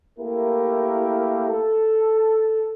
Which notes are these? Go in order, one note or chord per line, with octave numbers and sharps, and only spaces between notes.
A3 A#3 E4 G4 A#4
A4